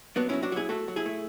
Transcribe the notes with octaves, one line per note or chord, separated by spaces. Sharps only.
F#3 B3 D4
F#3 C#4 E4
D4 F#4
F#3 E4 G#4
A3 F#4 A4
F#3
E4 G#4
A3